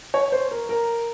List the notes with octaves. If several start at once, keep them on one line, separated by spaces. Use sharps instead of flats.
C#5
C5
A#4
A#4